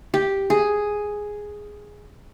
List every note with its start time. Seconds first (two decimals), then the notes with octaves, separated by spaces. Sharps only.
0.14 G4
0.50 G#4